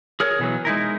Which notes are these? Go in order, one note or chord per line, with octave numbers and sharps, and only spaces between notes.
G#4 A#4 C#5
B2 E3 F#3
G#3 D#4 E4 A#4